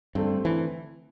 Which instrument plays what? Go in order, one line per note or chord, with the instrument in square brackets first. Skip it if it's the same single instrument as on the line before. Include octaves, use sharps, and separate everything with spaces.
[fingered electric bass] G2 [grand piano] D3 A3 C4
[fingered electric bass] E3